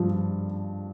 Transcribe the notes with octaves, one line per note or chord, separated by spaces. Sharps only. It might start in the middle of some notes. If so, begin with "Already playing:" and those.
Already playing: G2 F3